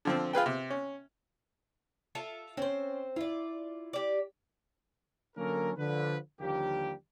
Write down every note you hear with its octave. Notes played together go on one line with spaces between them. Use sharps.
D3 F3 C4
F4 G#4 B4 G5
C3
C#4
F4 A4 E5
C4 C#4 C5
E4 F4 D5
G4 D5
D3 F#3 A#3 C#4 A4 A#4
D3 F3 B4
D#2 D3 F3 G3 A#3 G4